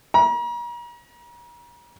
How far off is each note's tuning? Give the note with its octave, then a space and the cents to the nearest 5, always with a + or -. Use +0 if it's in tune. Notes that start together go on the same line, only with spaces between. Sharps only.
A#5 +40